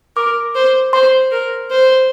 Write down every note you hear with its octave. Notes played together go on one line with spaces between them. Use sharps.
A#4 D6
C5
C5 C6
A#4
C5